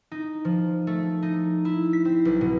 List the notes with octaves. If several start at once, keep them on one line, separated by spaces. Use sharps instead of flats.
D#4
F3
A3
D#4
E4
B6
C4
B1
B2